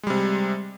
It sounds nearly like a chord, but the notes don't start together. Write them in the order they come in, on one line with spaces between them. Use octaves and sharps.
G#3 G3 C3